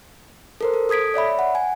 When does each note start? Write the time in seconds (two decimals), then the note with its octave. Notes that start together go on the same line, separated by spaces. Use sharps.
0.61 A4 A#4 C5
0.74 A4
0.89 A4 D#6 G#6 B6 D7
1.14 C#5 D5 E5 B5
1.39 F#5
1.55 G#5